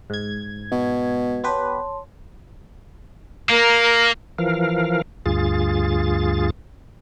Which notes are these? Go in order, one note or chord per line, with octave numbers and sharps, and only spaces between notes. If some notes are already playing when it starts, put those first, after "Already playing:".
G#2 G#6
B2
B3 G4 B4 C#5 A5 C6
A#3 A#4
E3 F3 A#4 F5
D2 G2 F4 G#4 A6